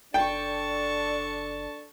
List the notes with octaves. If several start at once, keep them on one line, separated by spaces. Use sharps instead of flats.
F#1 D4 A4 D5 G5 A5 C#6